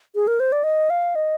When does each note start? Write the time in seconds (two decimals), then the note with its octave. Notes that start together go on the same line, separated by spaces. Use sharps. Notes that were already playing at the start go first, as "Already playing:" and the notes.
0.15 G#4
0.27 A#4
0.40 C5
0.52 D5
0.64 D#5
0.90 F5
1.15 D#5